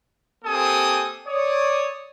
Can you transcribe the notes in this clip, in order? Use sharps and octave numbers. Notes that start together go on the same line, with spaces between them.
A#3 C4 G4 A4 G#5 D#6
C#5 D5 D#6